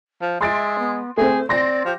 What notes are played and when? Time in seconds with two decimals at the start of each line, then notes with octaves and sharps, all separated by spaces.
0.22 F3
0.41 G#3 E5 C6 A6 D7
0.78 B3
1.17 A3 C4 G#4 C5
1.49 C4 D5 C6 A#6
1.85 F3 G4